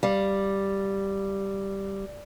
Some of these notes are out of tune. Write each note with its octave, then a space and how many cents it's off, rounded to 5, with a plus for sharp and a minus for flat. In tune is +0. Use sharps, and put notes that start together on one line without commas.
G3 +0 F5 -10